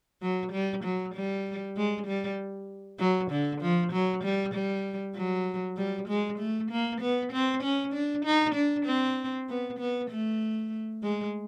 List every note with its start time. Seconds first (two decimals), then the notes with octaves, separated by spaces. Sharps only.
0.22 F#3
0.52 G3
0.84 F#3
1.14 G3
1.77 G#3
2.07 G3
2.99 F#3
3.31 D3
3.61 F3
3.92 F#3
4.24 G3
4.54 G3
5.15 F#3
5.77 G3
6.08 G#3
6.39 A3
6.71 A#3
7.01 B3
7.33 C4
7.63 C#4
7.93 D4
8.25 D#4
8.55 D4
8.86 C4
9.49 B3
9.79 B3
10.10 A3
11.03 G#3